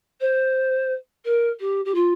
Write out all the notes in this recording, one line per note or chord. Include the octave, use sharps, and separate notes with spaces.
C5
A#4
G4
G4
F4